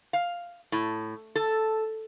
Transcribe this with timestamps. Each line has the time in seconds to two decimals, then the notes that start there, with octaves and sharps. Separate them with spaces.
0.13 F5
0.72 A2
1.35 A4